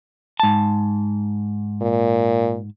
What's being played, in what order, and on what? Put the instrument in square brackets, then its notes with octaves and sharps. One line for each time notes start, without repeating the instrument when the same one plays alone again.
[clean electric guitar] G#2 A5
[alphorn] A#2